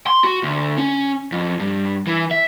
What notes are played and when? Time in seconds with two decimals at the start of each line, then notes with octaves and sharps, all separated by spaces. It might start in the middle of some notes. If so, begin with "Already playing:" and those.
0.07 C6
0.24 F#4
0.43 D2
0.78 C#4
1.32 F2
1.59 G2
2.07 E3
2.31 E5